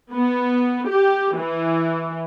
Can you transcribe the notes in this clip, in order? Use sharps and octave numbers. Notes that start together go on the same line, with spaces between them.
B3
G4
E3